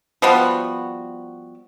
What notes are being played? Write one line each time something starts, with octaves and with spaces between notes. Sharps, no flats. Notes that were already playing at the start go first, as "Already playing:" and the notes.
F3 G3 B3 F#4